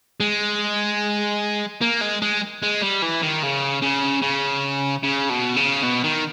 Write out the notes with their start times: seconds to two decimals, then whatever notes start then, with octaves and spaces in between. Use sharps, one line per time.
0.20 G#3
1.82 A#3
2.01 G#3
2.22 G#3
2.62 G#3
2.82 G3
3.02 E3
3.22 D#3
3.43 C#3
3.82 C#3
4.22 C#3
5.04 C#3
5.30 B2
5.57 C#3
5.83 B2
6.04 D#3